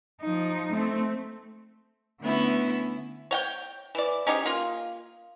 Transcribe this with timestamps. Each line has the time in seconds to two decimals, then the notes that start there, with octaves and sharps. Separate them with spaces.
0.21 F3 D#4
0.72 A3 C4
2.21 D3 A3 B3 C#4 E4
3.31 C#5 F#5 G5
3.95 E3 D5
4.27 C#4 D#4 G4 G#4
4.46 A#3 F4